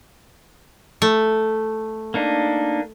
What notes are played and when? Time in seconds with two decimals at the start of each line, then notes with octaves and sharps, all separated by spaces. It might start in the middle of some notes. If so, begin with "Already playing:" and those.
1.02 A3
2.14 A#3 D4 D#4